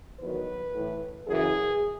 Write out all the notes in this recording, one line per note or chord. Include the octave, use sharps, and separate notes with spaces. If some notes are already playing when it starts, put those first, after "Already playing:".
E2 D#3 F#3 B4
A2 E3
F#2 C#3 E3 G#4